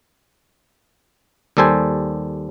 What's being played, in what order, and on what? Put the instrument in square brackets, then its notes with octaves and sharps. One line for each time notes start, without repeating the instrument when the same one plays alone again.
[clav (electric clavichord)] D#2 G3 A4 C5 G#5